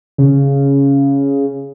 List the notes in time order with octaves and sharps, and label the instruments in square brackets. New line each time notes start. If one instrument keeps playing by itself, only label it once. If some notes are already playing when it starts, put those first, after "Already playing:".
[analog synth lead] C#3